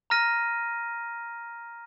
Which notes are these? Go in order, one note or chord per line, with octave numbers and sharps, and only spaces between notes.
A#5 F6 A#6 D#7